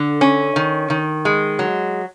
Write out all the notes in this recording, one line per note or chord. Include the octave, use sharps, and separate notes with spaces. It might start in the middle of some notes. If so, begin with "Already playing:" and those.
Already playing: D3
C#4
D#3
D#3
G#3
F#3